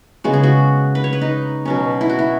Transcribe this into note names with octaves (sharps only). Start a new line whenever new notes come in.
C#3 G#3 B3 F#4
G#4
F#4
B4
C#5
B4
D#4
B2 F#3 C#4
E4
F#4
E4